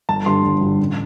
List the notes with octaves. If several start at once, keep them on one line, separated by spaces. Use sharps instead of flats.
G1 A5
G2 D3 C6
G1
G2 D3
A1